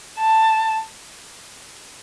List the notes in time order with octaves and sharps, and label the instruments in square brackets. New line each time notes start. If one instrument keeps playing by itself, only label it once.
[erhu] A5